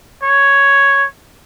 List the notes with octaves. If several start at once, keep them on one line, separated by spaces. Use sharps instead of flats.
C#5